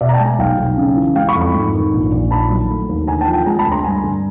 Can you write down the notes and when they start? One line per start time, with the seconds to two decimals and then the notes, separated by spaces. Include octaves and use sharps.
0.01 B2 D5 E5
0.09 A#5
0.14 G5 A5
0.20 G#3
0.26 G#5 A#5
0.39 B1 F5 G5
0.58 B1
0.77 C#3
0.96 E3
1.16 G#3 F5 G5
1.29 B5 C#6
1.35 F2
1.41 B5 C#6
1.54 G#2
1.74 D#3
1.93 A#1
2.12 A#1
2.31 D#3 A5 B5
2.50 F#3
2.69 A3
2.89 D#2
3.07 D3 G#5 A#5
3.21 G5 A5
3.28 F3
3.33 G5 A5
3.46 G#3 G#5 A#5
3.59 A5 B5
3.66 D2
3.72 A#5 C6
3.84 G2 G#5 A#5
4.04 D3